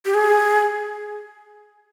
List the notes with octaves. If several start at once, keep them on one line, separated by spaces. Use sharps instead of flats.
G4
G#4